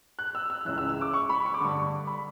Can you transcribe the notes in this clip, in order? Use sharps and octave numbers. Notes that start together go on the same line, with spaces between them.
F#6
E6
E6
C#2 C#3 E3 F#6
E6
E6
D6
C#6
B5
C#6
D6
G2 D3 C#6
B5